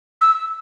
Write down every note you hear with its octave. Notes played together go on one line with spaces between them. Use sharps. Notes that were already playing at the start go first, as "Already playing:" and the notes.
E6